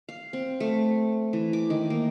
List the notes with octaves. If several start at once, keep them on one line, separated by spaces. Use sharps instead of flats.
F5
C4
A3
E3
D6
D#3
A#3